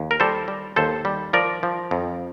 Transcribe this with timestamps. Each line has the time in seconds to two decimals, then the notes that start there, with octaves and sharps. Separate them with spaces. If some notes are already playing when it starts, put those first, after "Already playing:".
Already playing: D#2
0.11 A#4
0.20 G3 A4 C5
0.48 G3
0.76 D#2 A4 C5
1.05 G3
1.33 F3 A#4 D5
1.63 F3
1.91 F2